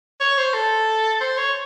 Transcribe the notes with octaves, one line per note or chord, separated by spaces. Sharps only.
C#5
C5
A4
C5
C#5